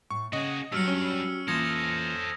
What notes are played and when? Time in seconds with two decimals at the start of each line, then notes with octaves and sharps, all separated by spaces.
0.11 A2 C#6
0.33 C#3 F#4 G#4 D#5 G#5
0.72 G2 F#3 F#4 G4 E6 F6 C#7
0.88 C#4
1.48 E3 A#3 F4 A4 C5 D#6 G#6 A#6